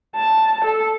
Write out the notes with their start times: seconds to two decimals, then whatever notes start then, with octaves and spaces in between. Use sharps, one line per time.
0.16 A5
0.65 A4